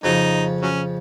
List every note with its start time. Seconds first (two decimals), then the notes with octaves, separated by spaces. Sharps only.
0.03 F2 C#3 F3 F#3 D#4
0.61 F#3 C#4